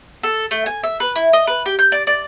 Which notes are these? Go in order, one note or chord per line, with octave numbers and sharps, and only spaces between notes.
A4
A3
G#5
E5
B4
E4
D#5
B4
G4
G6
D5
D5